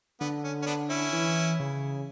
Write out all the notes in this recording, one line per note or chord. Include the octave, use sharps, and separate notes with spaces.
D3 B3
C#4
C#4
B3 D4
C#4 E4
E3
C#3